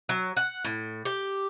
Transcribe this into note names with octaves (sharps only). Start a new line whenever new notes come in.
F#3
F#5
A2
G4